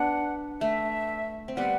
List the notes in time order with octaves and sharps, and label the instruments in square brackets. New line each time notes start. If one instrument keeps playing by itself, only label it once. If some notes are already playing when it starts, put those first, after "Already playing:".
Already playing: [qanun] B3 D4 [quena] F#5
[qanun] A3 [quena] E5
[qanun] C4
[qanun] G3 B3 [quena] F#5